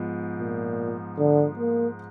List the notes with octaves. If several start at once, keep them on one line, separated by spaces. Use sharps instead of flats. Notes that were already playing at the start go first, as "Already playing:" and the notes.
Already playing: G#2 F3 B3
A#2
D3
A#3